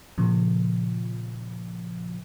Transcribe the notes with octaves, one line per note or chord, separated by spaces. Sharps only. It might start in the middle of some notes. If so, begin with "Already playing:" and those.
A#2 C#3 F3